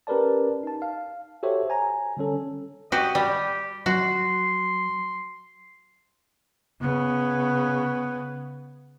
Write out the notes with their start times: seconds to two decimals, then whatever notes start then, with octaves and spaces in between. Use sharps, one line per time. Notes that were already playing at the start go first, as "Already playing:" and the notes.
0.07 C#4 G4 A#4 B4 D5 A5
0.63 D#4 A5
0.82 F5
1.43 F#4 G4 A4 C5 C#5 E5
1.70 G#5 A#5
2.17 D3 G3 C#4 A4
2.92 F#4 G4 D#5
3.15 G3 G4
3.86 F#3 F#4 C6
6.81 C#3 B3